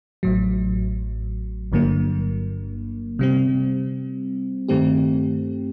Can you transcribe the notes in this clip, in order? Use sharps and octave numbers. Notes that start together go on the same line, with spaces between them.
A1 A2 F#3
G1 G2 D3 F#3 A#3
C3 G3 C4
G2 D#3 A3 C4 G4